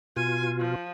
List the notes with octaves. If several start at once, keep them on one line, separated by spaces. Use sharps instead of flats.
B2 F4 G#5
F3